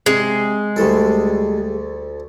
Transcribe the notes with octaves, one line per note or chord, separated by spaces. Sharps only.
C3 G#3
D2 G3 A3 G4 A4